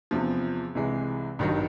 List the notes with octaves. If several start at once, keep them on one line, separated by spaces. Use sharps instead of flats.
E2 C3 F3
C2 C3 E3 G#3
A1 G2 D#3 F#3